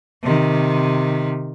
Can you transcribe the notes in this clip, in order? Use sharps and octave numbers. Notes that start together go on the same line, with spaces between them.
C3 D#3